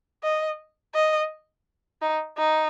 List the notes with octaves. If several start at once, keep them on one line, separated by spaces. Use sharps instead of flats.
D#5
D#5
D#4
D#4